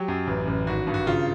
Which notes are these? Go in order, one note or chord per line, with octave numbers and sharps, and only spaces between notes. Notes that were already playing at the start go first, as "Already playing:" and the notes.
Already playing: F#3 G4
F#2
A1
A1
G#1 F#4
G2
F#4
C#3 F4